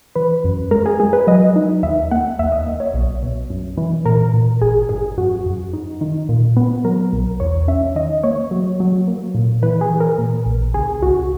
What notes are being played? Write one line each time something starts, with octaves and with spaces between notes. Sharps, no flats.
E3 B4
F#2
G#3 A#4
G#4
G#3 G#4
B4
F#3 D#5
D#4
D#2 E5
A#3 F#5
D#2 E5
D#5
A#3
C#5
B1
B2
F#2
E3
A#2 A#4
A#2
G#1 G#4
G#2 G#4
F#2 F#4
F#2
D#4
D#3
A#2
B3
F#3 A#4
B1
E2 C#5
C#4 E5
D#3 D#5
A#3 C#5
F#3
F#3
A#3
A#2
E3 B4
G#4
E3
A#4
A#2
A#1
C#2 G#4
C#2 F#4